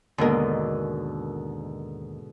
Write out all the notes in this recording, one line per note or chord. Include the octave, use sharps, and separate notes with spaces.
D#2 G#2 B2 D3 A#4